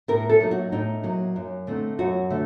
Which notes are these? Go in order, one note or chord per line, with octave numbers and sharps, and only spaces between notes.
A2 A#4
A4
F#3 A#3 D#4
F#4
A2 D#4
F#3 A#3 D#4
F#2
D3 A3 C4 D#4
F#2 F#4
D3 A3